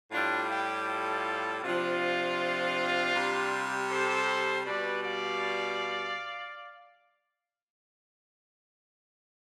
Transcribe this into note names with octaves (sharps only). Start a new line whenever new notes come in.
A2 G3 D4 F4
E4 G4
F4 A4
C3 F3 D4 F4
C3 G3
A4 C5
B2 G3 B4 D5
D5 F5